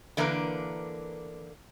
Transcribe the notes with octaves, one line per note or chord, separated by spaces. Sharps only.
D3 E3 A#3 D4 A#4 B4